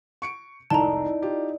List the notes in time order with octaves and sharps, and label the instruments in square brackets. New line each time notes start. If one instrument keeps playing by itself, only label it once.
[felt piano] C#6 C#7 D7
[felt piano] F1 C2 G#2 [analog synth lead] D#4 [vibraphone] E4 D5 [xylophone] A5 A#5
[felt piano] F4 G4